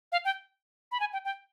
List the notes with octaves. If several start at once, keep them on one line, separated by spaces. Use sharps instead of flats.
F5
G5
B5
G#5
G5
G5